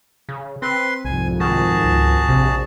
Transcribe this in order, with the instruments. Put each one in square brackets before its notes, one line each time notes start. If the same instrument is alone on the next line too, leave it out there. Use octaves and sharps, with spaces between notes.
[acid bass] C#3
[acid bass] C4 [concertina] B4 C6
[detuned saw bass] C2 [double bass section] F2 G#2 [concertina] G#5
[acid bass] D#3 [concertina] F#4 G#4 A5
[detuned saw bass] C#2
[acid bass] A#1 [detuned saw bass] C3